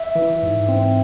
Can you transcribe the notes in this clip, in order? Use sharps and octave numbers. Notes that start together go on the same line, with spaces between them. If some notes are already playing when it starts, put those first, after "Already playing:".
Already playing: E5
E3
G#2
C4